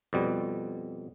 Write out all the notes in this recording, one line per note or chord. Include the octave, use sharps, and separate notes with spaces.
F2 B2 G3